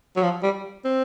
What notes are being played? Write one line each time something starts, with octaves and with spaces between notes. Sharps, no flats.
F#3
F3
G3
C4